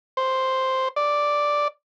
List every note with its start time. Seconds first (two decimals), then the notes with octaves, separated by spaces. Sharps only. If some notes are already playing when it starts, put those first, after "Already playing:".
0.17 C5
0.96 D5